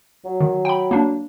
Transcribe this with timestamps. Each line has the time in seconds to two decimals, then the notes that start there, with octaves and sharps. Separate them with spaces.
0.25 F#3
0.40 D#3
0.65 G5 B5
0.91 A#3 D4